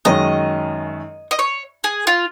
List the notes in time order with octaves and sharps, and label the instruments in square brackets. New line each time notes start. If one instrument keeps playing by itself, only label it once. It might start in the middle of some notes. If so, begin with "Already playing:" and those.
[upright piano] F#2 D#3 G#3 C#4 [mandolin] D#5
[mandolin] D#5
C#5
G#4
F4